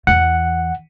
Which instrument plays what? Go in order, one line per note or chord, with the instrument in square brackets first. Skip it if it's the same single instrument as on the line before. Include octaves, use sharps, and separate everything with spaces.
[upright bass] E2 E3 [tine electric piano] F#5